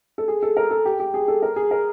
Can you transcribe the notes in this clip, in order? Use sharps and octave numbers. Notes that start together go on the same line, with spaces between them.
A4
G#4
A4
A#4
A4
G4
G4
G#4
A4
A#4
G#4
A#4